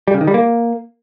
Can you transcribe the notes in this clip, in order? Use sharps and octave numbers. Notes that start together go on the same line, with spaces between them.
G3
C#3
D#3
G3
A#3